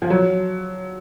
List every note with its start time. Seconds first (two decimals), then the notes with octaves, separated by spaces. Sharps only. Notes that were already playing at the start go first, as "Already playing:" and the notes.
0.02 F3
0.10 F#3